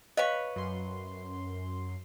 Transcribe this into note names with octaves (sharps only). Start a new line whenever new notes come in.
B4 C#5 D#5 F5 C#6
F#2 C6